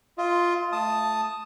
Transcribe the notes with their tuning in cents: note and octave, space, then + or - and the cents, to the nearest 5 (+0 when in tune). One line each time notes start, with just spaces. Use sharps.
F4 +0 D#5 +30
A3 -15 A5 +0 D#6 +0